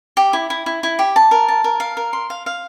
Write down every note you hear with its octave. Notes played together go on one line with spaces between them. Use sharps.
G4
E4
E4
E4
E4
G4
A5
A#4
A5
A#4
F5
A#4
C6
F5
F5